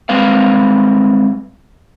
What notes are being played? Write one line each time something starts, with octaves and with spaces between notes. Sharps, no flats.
G3 G#3 C4 B4 F5